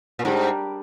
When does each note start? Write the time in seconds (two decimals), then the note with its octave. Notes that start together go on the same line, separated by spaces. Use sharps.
0.19 A#2
0.25 G#2 G3 D4 G4 A#4